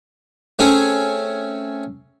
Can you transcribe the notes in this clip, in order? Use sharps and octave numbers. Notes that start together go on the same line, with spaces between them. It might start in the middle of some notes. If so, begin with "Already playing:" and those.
A3 C4 C#4 G#4